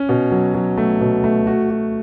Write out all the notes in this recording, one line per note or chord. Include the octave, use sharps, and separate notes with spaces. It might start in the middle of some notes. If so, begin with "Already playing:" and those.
Already playing: C#4
B2
F#3
F#3
A3
B2
A3
F#4
F#4